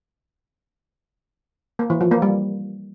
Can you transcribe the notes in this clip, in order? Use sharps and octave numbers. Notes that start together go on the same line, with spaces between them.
A#3
E3
F3
A#3
G3